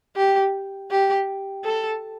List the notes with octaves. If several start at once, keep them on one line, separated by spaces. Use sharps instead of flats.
G4
G4
A4